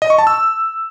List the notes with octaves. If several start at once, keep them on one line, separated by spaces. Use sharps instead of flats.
D#5
C#6
A5
E6